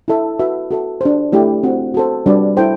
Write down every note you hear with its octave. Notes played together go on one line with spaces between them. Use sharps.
E4 A4 E5
F#4 B4 E5
F#4 A4 E5
D4 G4 C5
A3 E4 G4 D5 G5
C4 F#4 C5 F#5
F#4 A4 C5
G3 D4 F#4 B4 D5
E4 A4 C5 G5